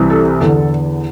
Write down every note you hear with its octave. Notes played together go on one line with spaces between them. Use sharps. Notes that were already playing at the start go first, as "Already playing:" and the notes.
Already playing: C2 C3 E3
A4
E2 D3 A4